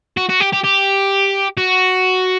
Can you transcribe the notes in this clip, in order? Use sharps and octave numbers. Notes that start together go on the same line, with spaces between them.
F#4
F#4
G4
G4
G4
F#4